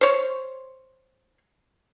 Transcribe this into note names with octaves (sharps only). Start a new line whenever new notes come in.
C5 C#5